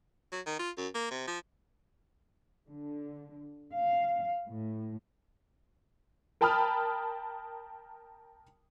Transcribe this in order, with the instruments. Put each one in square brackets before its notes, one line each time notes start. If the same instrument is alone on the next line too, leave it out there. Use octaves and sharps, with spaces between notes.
[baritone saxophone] F#3
D#3
F4
F#2
A#3
C3
F3
[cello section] D3
F5
A2
[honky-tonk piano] A#4 G5 A5 B5 D#6 F6